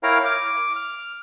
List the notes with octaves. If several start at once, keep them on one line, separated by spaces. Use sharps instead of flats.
E4 A#4 C#5 F5 G5 A#5
D6
F6